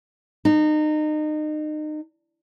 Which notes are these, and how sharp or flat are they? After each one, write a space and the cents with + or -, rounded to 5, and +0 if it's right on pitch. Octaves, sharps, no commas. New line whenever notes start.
D#4 -30